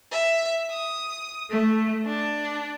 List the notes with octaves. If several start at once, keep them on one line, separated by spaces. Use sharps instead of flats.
E5
D#6
A3
D4